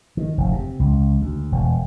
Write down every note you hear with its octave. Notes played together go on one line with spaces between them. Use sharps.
D#3
F1
C3
C#2
D2
E1